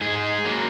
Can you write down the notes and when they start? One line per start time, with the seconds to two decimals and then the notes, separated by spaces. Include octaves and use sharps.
0.01 G#2 G#4
0.45 F#3 A#3